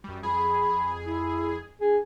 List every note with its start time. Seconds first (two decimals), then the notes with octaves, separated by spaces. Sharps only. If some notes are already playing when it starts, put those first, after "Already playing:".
0.04 F#2 G3
0.23 F2 G#4 B5
1.05 E4
1.81 D4 G#4